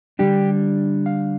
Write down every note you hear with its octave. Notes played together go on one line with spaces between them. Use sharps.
D3 G3 D4 G4
F5